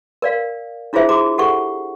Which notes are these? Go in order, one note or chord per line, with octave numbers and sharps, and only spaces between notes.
A#4 D5 F5
D4 E4 F4 G#4 C5 E5
F#4 G#4 A#5 D6
G4 A4 F#5 C#6